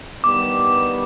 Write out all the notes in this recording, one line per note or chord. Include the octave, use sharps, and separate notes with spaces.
G2 D#3 G3 B3 D6